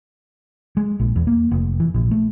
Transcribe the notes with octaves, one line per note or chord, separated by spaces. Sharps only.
G#3
A#1
E2
A#3
F1
E3
A#1
A3